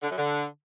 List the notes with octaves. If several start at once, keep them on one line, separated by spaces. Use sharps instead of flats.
D3
F#2
D3